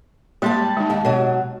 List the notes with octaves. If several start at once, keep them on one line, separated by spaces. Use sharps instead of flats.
G3 G#3 A#3 G4 A5 C6
G#3 D#4
D#2 A5
B2 F#3